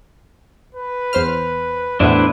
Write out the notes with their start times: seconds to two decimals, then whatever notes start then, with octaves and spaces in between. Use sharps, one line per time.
0.75 B4
1.13 E2 C5 F6
2.00 E2 A2 B3 D4 E4 B4 C5